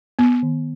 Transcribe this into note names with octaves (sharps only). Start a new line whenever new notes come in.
B3
D#3